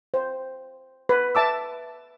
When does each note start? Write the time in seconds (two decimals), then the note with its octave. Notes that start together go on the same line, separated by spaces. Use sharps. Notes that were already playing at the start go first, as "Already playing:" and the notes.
0.14 C5
1.09 B4
1.35 E5 A5 D6 E6